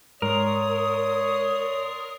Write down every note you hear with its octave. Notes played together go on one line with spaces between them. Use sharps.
G#2 A#4 C#5 D5 C6 D#6